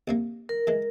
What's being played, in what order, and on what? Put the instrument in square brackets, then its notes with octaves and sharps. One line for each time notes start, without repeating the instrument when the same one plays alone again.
[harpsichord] A#1 C3 A#3
[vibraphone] A#4
[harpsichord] E3 G#3